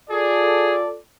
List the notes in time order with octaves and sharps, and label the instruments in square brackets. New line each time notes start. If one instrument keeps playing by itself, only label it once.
[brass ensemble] F4 A4 D5 [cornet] G#4